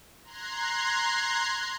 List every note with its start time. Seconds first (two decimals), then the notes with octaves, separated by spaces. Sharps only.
0.24 A#5 C6 F#6 G#6 C7